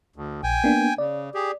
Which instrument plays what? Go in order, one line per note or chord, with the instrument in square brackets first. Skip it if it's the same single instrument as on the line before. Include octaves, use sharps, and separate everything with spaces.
[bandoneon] D2
[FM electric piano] A#1 [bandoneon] G5 G#5
[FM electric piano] A#3 B3 D4
[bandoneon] C#3 [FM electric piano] D5
[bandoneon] G4 G#4